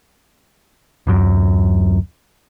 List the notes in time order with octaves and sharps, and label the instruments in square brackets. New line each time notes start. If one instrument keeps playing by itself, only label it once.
[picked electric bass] D1 F#2